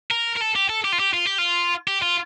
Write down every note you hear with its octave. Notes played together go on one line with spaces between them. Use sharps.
A#4
A#4
A4
G4
A4
G4
F4
G4
F4
G4
F4
G4
F4